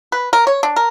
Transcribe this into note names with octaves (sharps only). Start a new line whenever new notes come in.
B4
A#4
C#5
D4
A#4